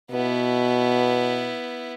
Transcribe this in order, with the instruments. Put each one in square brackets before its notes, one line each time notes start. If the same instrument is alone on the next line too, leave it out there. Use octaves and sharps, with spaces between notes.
[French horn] B2 [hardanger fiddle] B3 E4